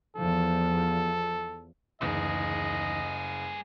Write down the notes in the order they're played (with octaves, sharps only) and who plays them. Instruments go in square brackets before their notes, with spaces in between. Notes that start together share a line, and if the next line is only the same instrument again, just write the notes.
[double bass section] E2 F3 [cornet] A4
[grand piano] F#1 [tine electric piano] D2 E3 D#4 [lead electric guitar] G3 G#4 [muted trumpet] D#5